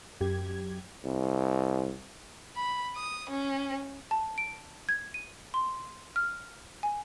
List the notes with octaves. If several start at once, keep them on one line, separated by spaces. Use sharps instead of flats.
F#2 G4 G#6
C2
B5
D#6
C#4
A5
D7
G#6
D#7
C6
F6
G#5